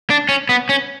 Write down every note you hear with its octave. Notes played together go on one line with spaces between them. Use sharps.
D4
C#4
B3
C#4